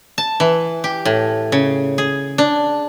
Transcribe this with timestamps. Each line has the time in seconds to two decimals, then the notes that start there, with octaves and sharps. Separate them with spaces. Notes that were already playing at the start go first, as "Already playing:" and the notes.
0.18 A5
0.40 E3
0.84 G4
1.05 A2
1.52 C#3
1.98 G#4
2.38 D4